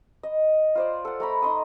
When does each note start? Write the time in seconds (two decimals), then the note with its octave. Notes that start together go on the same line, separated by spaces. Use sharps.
0.23 D#5
0.75 F4 C5 D5
1.05 A4 F#5
1.20 A3 A#5 B5
1.42 D#4 C6 D#6